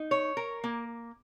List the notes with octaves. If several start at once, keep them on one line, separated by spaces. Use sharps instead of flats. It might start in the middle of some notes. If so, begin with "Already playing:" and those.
Already playing: D#4
C#5
A#4
A#3